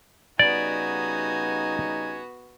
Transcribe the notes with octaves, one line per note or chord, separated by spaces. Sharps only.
C#3 G3 B3 D#4 F#4 D5 G#5